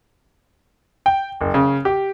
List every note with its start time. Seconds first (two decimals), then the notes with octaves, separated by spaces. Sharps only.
1.06 G5
1.41 F#1
1.54 C#3
1.85 G4